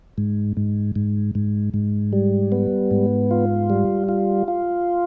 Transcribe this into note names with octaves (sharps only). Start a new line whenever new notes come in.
G#2
G#2
G#2
G#2
G#2
G3
B3
G#2
F4
G3
F4
F4